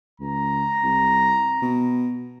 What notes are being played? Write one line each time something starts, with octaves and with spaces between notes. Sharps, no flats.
C#2 A#5
C2
B2